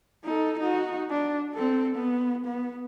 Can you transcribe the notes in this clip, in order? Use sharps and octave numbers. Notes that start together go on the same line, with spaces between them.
D#4 A4
D#4 F#4
D4
C4 A4
B3
B3